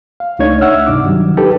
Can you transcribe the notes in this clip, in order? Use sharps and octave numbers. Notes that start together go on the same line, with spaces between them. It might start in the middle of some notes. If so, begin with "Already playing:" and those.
F5
C#2 A3 D4 D#4 C#5 G#6
E5 F#5 E6 F6
G2 C3 D4 D#4 D6
D#3 F#3 G3
D#4 G4 A4 B4